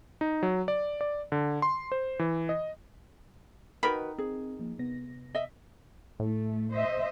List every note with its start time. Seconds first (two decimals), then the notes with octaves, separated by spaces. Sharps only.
0.21 D#4
0.43 F#3
0.68 D5
1.01 D5
1.32 D3
1.62 C6
1.92 C5
2.19 E3
2.49 D#5
3.83 D#3 D#4 F#4 A#4 B4 D#5 B5
4.18 C4 G#4
4.60 F3 A#3
4.79 C3 B3 A#6
5.35 D#5 E5
6.20 A2 A3
6.73 C5 D#5 E5